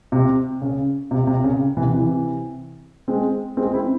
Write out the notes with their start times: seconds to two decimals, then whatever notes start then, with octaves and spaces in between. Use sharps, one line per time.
0.12 C3
0.62 C#3
1.11 C3
1.27 C3
1.43 C#3
1.77 C3 E3
1.93 C3 E3
3.08 G#3 C4
3.57 G#3 C4
3.73 C4 E4